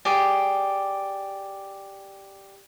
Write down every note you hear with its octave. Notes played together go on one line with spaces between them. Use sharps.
G4 G#4 D5